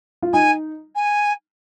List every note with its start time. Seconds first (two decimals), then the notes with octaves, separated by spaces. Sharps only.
0.22 F4
0.33 D#4 G#5
0.95 G#5